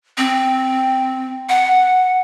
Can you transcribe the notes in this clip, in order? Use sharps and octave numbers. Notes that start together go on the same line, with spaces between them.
C4
F#5